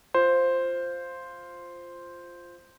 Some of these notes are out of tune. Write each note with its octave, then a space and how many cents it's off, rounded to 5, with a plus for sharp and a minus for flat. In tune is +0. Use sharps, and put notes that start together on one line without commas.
F4 +0 C5 +0